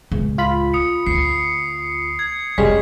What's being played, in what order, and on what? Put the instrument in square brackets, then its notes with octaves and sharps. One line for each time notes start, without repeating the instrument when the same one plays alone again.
[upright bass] D1 C#2
[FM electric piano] F4 B5
[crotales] D#6 C#7
[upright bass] D2 [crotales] C7 C#7
[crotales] G#6
[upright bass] F1 D4 [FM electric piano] G3 G#3 C#4 [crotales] B6